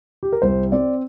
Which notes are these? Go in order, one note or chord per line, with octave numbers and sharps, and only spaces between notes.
G4
A#4
C2 C5
C4 D5